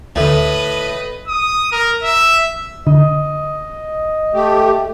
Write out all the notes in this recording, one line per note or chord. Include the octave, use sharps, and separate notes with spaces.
D2 A2 D3 B4 D#5
D#6
A#4
E5
D3 D#5
A3 G4